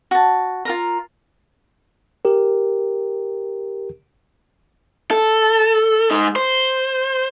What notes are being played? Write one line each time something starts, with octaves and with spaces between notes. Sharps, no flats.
F#4 A5
F4 A#4 A#5
G4 A#4
A4
G#3 D#4
C5